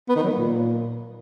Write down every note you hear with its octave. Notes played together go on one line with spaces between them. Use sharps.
B3
D#3
F#3
A#3
A#2